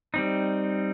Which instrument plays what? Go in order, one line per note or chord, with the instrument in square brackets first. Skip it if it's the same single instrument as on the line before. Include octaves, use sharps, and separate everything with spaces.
[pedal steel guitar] G3 C4 D#4